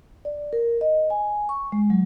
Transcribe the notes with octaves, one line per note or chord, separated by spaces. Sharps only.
D5
A#4
D#5
G#5
C#6
G#3
F#3